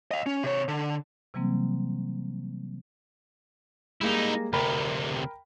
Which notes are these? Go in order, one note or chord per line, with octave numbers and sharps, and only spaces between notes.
D#5 F5
C#4
C3 C#5
D3
C3 E3 F#3 G3 A#3 C4
G3 G#3 A#3 D#4 E4
D2 C3 A#4 G5 B5